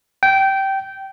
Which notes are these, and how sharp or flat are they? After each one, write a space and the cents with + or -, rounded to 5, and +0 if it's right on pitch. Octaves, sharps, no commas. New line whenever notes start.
G5 -15